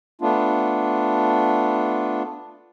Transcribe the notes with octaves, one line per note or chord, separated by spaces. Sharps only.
A3 B3 D4 F4